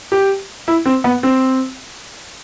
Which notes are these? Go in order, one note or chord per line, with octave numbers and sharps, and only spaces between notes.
G4
E4
C4
B3
C4